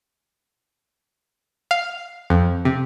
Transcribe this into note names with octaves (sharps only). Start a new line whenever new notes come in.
F5
F2
C3